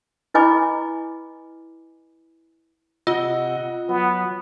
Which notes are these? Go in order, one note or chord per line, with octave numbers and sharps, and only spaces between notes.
E4 B4 D#5 G#5 B5 D6
C3 F4 D#5 F#5
F#3 B3